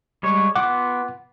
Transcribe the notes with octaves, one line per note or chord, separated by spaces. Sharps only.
G3 G#3 C#5
B3 F4 F#5 D6